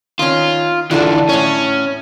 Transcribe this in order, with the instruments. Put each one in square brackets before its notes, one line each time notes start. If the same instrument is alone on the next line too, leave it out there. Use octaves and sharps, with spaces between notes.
[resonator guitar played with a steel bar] D#3 C#4 [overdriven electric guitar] F4
[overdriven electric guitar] D3 E3 [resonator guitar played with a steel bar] D4 F4 A4 [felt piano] E4 A5
[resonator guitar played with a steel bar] A2 C#5 [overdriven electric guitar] C#4